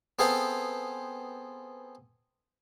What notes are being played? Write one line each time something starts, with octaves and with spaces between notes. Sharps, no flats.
B3 C4 G#4 A4 C5 F5